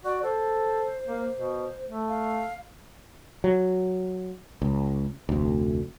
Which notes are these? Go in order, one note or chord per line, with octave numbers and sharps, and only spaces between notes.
F#4 D5
A4 C5
A#3
B2
A3
F5
F#3
C#2
F1 D2